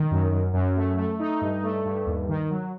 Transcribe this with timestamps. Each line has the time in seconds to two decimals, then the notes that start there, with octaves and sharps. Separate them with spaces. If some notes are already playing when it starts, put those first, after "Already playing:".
Already playing: D#3
0.11 F#2
0.32 F#2
0.54 F#2
0.76 A3
0.97 A3
1.19 D#4
1.41 G2
1.64 A3
1.85 G2
2.06 D#2
2.29 D#3
2.50 F#3